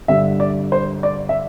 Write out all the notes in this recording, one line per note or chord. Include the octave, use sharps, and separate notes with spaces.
G2 D3 E5
D5
C5
D5
E5